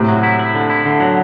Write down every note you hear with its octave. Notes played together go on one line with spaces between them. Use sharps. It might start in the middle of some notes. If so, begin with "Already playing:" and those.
Already playing: A2 C3
F#3
E4
E4
D3
E4
D3
F#3